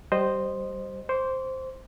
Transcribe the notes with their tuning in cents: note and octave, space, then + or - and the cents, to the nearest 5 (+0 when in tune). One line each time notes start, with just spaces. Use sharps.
G3 -20 C5 +0 D#5 -15
C5 +0 D6 -45